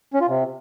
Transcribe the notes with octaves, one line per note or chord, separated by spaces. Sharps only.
C#4
F4
C3